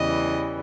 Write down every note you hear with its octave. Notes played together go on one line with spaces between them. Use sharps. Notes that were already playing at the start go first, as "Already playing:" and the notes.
Already playing: E2 C#3 E3 G3 D#5